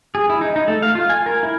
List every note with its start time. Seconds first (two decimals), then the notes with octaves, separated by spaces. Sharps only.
0.15 G#4
0.30 E4
0.41 D#4
0.56 D#4
0.68 A3
0.82 F5
0.95 F4
1.10 G#5
1.26 A#4
1.43 E4